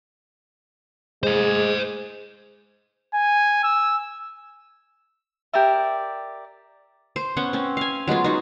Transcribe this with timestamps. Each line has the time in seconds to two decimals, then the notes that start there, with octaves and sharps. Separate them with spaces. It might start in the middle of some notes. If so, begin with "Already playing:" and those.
1.23 G#3 C5 D#5
3.14 G#5
3.63 E6
5.53 G4 A#4 D5 E5
7.16 C5
7.37 B3 C#4 F#5
7.53 C4 C#4
7.77 F5 G#5
8.07 F#3 G#3 B3 F4
8.24 D#4 F#4